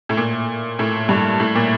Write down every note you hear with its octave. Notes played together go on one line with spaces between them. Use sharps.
A2
A#2
A2
G2
A2
A#2